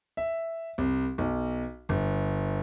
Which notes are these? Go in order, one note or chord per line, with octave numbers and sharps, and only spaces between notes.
E5
C2
B1
G1